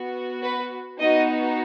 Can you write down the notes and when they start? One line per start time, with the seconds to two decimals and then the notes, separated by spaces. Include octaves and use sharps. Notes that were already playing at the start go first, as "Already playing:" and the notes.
Already playing: B3 F#4
0.43 B4
0.99 B3 D#4 F#4 D#5